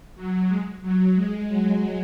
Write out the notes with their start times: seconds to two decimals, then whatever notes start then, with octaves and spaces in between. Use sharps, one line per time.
0.16 F#3
0.48 G#3
0.81 F#3
1.15 G#3
1.47 F#3